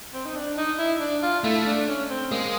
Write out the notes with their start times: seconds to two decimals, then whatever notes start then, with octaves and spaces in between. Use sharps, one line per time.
0.14 C4
0.25 D#4
0.36 D4
0.57 D#4
0.79 E4
1.00 D4
1.23 F4
1.44 A3 E4
1.66 D4
1.88 C#4
2.10 C4
2.31 G#3 A#3